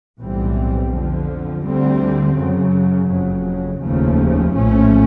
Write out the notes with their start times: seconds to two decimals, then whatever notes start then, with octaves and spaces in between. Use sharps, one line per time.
0.19 B1 A2 E3 G3 C4
0.91 F2 D3 F3
1.64 D2 D3 G3 C4
2.36 F#2 C#3 F#3
3.09 F#1 F2 C#3 F#3
3.82 F1 D#2 C#3 F3 A3
4.54 A#1 A2 F3 A3 C#4